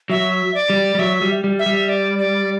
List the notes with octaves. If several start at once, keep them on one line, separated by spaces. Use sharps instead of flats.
F#3 E5
D5
G3
G3
F#3 E5
G3
G3
E5
G3
D5
D5